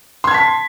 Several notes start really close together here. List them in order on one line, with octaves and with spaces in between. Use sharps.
C6 G#6 A5 B6